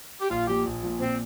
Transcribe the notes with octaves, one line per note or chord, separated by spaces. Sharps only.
G4
A#1 F4
A#2 F3 G4
A#1
A#2 F3
A#2 C4